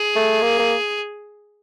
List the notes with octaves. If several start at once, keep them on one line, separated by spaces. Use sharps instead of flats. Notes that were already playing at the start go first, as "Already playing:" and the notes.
Already playing: G#4
A3
A#3
A#3